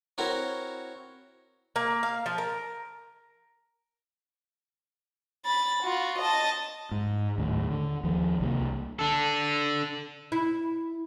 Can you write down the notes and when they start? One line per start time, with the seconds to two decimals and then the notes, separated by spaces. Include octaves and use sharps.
0.18 C4 E4 F#4 A#4 C#5
1.76 A#3
2.03 F5
2.26 F3
2.38 A#4
5.45 B5 A6
5.83 F4 F#4
6.19 D#5 A5
6.91 G#2
7.38 D#2 A2
7.70 D3
8.04 D#2 F3
8.40 C2 C3 G#3 A#3
8.99 D4 A4
10.32 E4